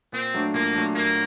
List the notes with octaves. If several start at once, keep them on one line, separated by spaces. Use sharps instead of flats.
A#2 C4
F#3 A3 D4
A#2 A#3
F#3 A3 D4
A#2 A#3